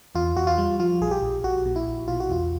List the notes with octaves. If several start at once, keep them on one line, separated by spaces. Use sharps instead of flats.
E2 F4
E2 F#4
F4
G3
F3 F4
A#1 G#4
G4
A#1
A#1 F#4
A#2
E4
A#1
B2 F4
F#4
E2 F4